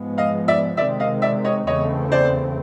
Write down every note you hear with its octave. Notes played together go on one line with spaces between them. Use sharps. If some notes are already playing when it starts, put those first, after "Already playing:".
Already playing: G#2 F3 G#3 B3
D#5 F5
D5 E5
C3 D#3 G#3 C4 D5 E5
D#5 F5
D5 E5
C#5 D#5
E2 C#3 E3 A3 C4 C#5 D#5
C5 D5